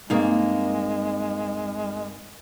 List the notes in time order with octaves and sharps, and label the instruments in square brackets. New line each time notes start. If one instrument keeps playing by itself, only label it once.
[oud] G2 A#3 G#4 [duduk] G#3 [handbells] C4 D#4